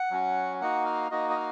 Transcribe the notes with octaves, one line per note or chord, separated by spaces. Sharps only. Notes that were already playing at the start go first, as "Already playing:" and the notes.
Already playing: F#5
F#3 C#4 F#4
A#3 D#4 F#4 F#5
F5
A#3 D#4 F#4 D#5
D#5
F5